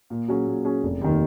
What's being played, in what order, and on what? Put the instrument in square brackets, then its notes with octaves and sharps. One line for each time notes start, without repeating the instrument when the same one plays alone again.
[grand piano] A#2
F#3 C#4 G#4
A#2
F#3 C#4 G#4
F1
D#2 D#3